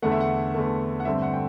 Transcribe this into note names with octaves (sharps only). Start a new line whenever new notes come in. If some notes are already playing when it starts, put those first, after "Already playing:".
E2 D3 A3 F#5
E5
F#5
E2 D3 A3
F#5
G2 D3 A3 C4 E5
F#5
G5